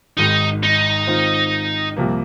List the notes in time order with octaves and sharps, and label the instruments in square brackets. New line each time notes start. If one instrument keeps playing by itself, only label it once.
[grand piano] G#1 G#2 D#3 G#3 [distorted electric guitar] D#4
[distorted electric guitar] D#4
[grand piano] G#2 D#3 C4 F4 C5
C2 C3 F3 A#3